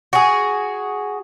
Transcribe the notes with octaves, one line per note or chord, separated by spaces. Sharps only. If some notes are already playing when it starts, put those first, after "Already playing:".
F#4 G#4